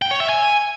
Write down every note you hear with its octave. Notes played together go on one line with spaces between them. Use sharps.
G5
C#5
E5
G#5